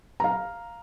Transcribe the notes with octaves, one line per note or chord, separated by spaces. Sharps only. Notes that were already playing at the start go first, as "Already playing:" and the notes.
F5 A#5